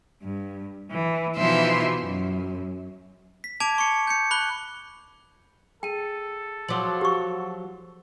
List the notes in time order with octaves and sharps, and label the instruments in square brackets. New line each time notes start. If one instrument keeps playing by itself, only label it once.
[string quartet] G2
E3
B2 E3 F3 D#4 E5 C6
F#2
[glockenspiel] B6
A5 D6 G#6 D7 F7
C#6 C#7
G6 C#7
B5 F#6 G7
[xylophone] G#4 D#7 [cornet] A4 [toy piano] G5
[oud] F3 F#3 [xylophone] C6 D6 F#7
[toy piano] G4 C#6